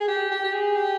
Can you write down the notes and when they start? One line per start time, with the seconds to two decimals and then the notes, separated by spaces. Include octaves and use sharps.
0.01 G#4
0.08 G4
0.31 G4
0.44 G4
0.53 G#4
0.76 G4